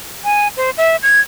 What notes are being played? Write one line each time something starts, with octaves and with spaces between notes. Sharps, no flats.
G#5
C5
E5
G#6